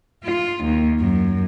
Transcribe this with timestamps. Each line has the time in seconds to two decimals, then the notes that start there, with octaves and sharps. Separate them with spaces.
0.25 F4
0.64 D#2
0.99 F#2